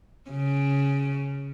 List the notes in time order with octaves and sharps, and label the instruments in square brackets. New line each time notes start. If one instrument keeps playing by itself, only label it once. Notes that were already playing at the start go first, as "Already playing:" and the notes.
[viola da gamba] C#3